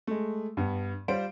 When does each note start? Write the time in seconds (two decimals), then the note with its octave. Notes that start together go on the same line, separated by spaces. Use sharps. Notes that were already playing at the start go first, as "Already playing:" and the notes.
0.07 G#3 A3
0.57 G2 B3
1.08 G3 F4 C5 D7